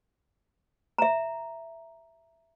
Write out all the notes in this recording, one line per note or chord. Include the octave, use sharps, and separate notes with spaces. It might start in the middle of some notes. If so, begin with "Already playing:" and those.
E5 A#5